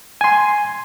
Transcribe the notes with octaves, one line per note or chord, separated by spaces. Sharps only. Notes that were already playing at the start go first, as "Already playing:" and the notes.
G#5 C6